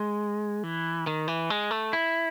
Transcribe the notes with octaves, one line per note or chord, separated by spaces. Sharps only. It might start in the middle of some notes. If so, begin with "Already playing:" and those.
Already playing: G#3
E3
D#3
E3
G#3
A3
E4